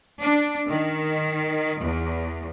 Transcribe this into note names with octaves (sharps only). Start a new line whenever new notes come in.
D4
D#3
E2